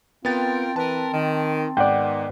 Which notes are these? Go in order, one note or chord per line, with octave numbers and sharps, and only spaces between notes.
B3 C4 F4 A#4 G5 A6
E3 A#4 B4 A5
D#3
G#2 D#3 B3 D5 F#5 G5